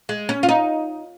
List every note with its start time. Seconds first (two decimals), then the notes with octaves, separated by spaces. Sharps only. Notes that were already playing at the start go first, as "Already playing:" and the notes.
0.09 G#3
0.29 C#4
0.43 F4
0.49 D#4